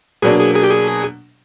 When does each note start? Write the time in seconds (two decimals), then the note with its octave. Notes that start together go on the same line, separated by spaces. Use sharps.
0.22 B2 F#3 A#3 D4 G#4
0.39 G#4
0.56 G#4
0.63 G4
0.71 G#4